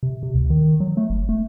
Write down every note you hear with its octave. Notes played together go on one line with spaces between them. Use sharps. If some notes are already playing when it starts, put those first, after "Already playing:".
C3
C3
D2
D#3
F#3
A3
F#1
A3